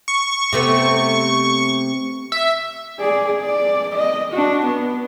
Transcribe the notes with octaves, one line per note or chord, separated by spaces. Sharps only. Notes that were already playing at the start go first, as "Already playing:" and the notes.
C#6
C3 A3 B3
E5
G#4 D5
D5
D#5
D4 F#4
B3